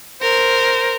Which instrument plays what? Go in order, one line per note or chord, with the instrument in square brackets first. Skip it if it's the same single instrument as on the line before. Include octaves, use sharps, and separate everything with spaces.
[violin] A#4 C5